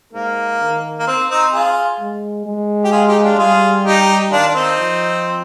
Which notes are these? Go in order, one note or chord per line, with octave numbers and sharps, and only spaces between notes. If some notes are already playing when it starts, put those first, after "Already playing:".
G#2 A#3
D#3
A#3
C4
C4 D#4
F4 G#4
G#3
G#3
G4
F4 G#4
D#4 G4
D4 F4
G3 F4 G#4
D#4 G4
D#3 D4 F4
D4
C4 D#4
F3